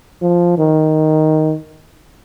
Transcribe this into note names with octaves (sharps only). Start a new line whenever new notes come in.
F3
D#3